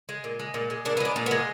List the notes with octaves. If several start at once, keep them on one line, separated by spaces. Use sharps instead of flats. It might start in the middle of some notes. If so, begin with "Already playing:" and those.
G#3
A#2
G#3
A#2
G#3
A#2 D4
B3
G#3 D4
A#2
B3
G#3